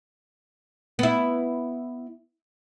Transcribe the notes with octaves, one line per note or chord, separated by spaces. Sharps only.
B3 E4